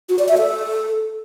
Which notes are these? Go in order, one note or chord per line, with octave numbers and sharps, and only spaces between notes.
F#4
D5
E5
A4